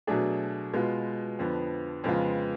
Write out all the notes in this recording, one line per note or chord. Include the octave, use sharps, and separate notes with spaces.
B2 F#3 A3 D4 G#4
B2 G#3 B3 F4
F2 D3 F3 B3
F2 C#3 G#3 B3 F4